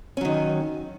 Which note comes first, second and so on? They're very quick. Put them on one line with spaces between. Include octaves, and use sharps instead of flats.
C#4 F#3 D#3